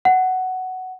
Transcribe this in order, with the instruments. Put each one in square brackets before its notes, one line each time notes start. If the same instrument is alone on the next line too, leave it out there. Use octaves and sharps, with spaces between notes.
[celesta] F#5